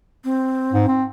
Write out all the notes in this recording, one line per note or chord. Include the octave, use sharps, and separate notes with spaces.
C4
G#2
C4